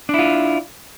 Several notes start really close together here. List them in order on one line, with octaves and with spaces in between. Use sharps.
D4 E4 F4